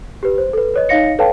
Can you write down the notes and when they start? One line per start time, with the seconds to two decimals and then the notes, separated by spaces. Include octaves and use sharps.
0.23 G4 B4
0.38 C5
0.53 A4 B4
0.74 B4 C#5 D#5
0.89 D#4 C#5 D#5 F5 A#6 C#7
1.19 A4 B4 C#5 F5 G5 A5